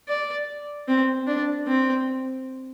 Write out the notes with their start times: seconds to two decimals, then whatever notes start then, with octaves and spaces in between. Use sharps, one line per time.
0.08 D5
0.88 C4
1.27 D4
1.67 C4